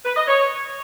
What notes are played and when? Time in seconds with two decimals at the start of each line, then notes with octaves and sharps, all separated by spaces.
0.04 B4
0.16 D#5
0.27 C#5